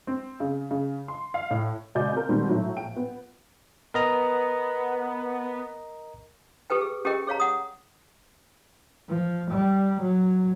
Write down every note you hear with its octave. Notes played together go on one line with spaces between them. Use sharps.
C4
C#3
C#3
C6
F5
A2
C#2 F#4 D5 D#5 G#5 G6
C4 A#4
B2 D#3 G3 G#3 C4
A2 F#3
A#1 G5 D7
B3
B3 A#4 D#5 A#5
G4 A4 B4 G5
G#4
C#4 G4 G#4 A#4 D#5 G5
G#4 C#5 F5 A#5
F#5 D#6
F3
G3
F#3